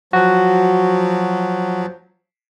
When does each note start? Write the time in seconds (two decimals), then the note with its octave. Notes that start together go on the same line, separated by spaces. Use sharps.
0.13 F3 F#3 F#4